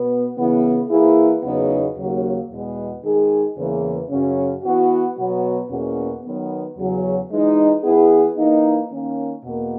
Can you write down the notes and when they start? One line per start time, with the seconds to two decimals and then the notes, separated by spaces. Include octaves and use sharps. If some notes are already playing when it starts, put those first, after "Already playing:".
Already playing: B2 B3
0.37 C#3 E3 B3 E4
0.89 E3 A#3 E4 G#4
1.43 E2 C#3 F#3 B3 D#4
1.97 D#2 C#3 F#3 A#3
2.49 E2 B2 G#3 B3
3.02 D#3 G#3 D#4 G#4
3.56 E2 C#3 E3 A#3
4.09 F#2 C#3 F#3 C#4
4.63 E3 B3 F#4
5.16 B2 F#3 B3 F#4
5.70 E2 B2 A#3 C#4 F#4
6.23 D#3 F#3 B3
6.77 E2 C#3 F#3 C#4
7.30 E3 G#3 D#4
7.83 E3 B3 E4 G#4
8.36 E3 A#3 D#4
8.90 D#3 A#3 C#4
9.43 E2 B2 A#3